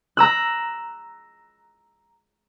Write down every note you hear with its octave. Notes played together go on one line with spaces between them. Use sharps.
A#5 E6 F#6